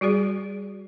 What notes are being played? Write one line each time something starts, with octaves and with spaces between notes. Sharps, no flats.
G3 F#4 G#4 D5